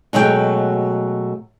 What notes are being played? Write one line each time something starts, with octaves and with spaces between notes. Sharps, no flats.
B2 F#3 G#3 A3 D5 G5